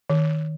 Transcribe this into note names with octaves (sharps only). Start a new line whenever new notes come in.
D#3